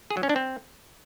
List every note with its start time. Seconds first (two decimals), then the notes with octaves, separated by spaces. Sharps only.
0.10 G#4
0.17 F#3
0.23 C#4
0.29 D4
0.36 C4